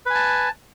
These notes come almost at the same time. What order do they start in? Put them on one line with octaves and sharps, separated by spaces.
B4 G#5 A5